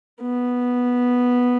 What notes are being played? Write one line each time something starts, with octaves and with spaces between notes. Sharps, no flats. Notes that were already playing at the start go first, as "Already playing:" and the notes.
B3